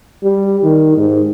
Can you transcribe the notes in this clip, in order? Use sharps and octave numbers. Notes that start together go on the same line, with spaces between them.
G3
D#3
G#2